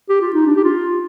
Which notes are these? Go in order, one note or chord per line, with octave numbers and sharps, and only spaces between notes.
G4
F4
D#4
D4
G4
F4